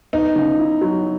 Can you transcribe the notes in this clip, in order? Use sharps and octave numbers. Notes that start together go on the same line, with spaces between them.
B3 D#4
C#3
E4
F#3